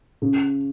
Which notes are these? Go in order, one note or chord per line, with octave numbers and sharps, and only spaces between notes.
C#3